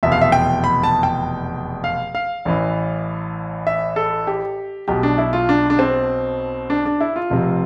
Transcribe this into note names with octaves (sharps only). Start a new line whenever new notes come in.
F1 E2 B2 E5
F5
E5
G5
B5
A5
G5
F5
F5
A1 A2 E3
E5
A4
G4
B1 B2 G4
D4
E4
F4
D4
D4
C4
D4
D4
E4
F4
F1 F2 C3